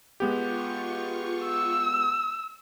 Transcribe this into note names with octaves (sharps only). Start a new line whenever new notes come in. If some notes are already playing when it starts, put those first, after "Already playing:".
G#3 B3 F4 G4 C#6
E6